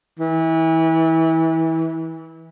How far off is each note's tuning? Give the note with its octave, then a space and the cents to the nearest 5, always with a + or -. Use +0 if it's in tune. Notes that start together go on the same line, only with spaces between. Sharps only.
E3 -30